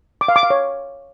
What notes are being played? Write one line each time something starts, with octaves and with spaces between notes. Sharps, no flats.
D6
F5
D6
F5
C#5